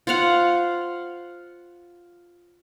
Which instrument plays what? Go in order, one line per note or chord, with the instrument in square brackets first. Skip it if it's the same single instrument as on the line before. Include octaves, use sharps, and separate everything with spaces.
[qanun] F4 C5 F5 F#5